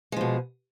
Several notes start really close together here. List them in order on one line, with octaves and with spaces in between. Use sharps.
G#3 F3 B2